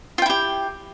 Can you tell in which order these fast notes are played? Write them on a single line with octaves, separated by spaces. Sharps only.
F4 G5 E4 G4